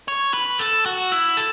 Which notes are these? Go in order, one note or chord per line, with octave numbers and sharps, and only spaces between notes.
C#5
B4
A4
F#4
E4
A4